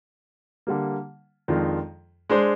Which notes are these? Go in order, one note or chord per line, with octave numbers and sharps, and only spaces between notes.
D3 G3 A#3
F2 D#3 G#3 D4 F4
G#3 D4 G#4 C5